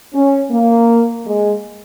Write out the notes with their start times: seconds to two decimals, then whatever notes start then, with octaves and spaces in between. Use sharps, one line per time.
0.14 C#4
0.51 A#3
1.26 G#3